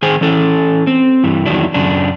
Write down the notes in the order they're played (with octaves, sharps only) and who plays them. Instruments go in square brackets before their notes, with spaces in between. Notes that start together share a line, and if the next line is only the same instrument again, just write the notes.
[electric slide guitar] D#3 G#4 C5 G#5
E3 C#4 A4
C4
G2 E3
E2 D#3 F#3 D4 E4
F#2 C#3 D4